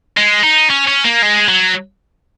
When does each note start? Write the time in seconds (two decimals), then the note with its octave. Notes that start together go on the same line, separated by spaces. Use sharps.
0.17 G#3
0.43 D#4
0.70 C#4
0.87 C#4
1.04 A#3
1.22 G#3
1.48 F#3